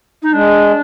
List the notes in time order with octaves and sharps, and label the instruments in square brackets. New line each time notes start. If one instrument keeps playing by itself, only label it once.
[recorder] D#4
[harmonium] G#3 [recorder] D4